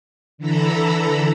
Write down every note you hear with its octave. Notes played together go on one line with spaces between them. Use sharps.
D3 E3 A4 A#5 B5 E6